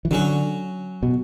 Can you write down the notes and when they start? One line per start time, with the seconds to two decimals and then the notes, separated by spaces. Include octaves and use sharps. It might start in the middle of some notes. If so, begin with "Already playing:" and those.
0.05 E3
0.11 D3 F#3 C#4 F#4
1.03 B2